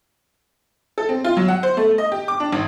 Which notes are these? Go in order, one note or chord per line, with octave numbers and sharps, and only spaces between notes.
A4
C4
F4
F#3
F#5
C5
A3
D#5
G4
D6
D4
G#1